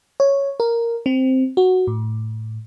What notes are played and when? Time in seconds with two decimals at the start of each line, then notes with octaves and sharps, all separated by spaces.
0.20 C#5
0.60 A#4
1.06 C4
1.57 F#4
1.87 A2